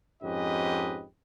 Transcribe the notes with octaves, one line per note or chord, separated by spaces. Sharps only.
F2 G#2 C#4 G4 B4 D#5